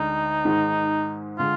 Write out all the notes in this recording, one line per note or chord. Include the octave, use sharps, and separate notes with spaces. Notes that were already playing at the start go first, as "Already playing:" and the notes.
Already playing: D2 D3 G#3 D4 D#4
G#2 D#3 G#3
D3 G#3 F4